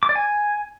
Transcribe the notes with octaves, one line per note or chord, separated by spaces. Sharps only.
D6
D5
G#5